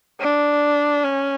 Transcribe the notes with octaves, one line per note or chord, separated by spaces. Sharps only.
D4
C#4